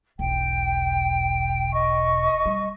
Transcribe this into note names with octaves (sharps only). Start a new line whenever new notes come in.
E1 B1 G5
D#5 C#6
G3